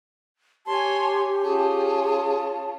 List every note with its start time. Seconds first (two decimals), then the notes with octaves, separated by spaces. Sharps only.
0.66 G4 C#5 G#5 A5 C6
1.44 C#4 F4 G#4 A5